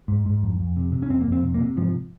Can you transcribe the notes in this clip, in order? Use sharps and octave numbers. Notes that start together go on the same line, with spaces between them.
G#2
G#2
F2
F2
C3
C3
C#4
F2 C4
A#3
F2
C4
C3
A#3
C3
G#2 F3